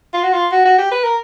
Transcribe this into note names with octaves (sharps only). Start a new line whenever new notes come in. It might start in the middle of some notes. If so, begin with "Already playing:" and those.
F4
F#4
F4
F#4
F#4
G4
B4
A#4